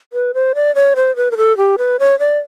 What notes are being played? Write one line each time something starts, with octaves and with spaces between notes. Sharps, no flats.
B4
C5
D5
C#5
C5
B4
A#4
A4
G4
B4
C#5
D5